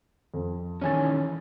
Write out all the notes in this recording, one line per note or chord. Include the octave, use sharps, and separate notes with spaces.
F2
D#3 E3 C#4 C#5 G#5 A6